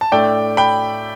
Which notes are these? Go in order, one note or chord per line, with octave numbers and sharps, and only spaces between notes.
A5
A2 A3 D4 D5 G5
G5 B5